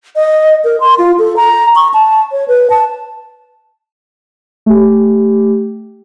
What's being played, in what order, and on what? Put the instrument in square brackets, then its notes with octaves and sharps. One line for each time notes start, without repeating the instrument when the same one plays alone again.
[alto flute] D#5
A#4
C6
F4
A4
A#5
C#6
A5
C#5
B4
A5
[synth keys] A3 G4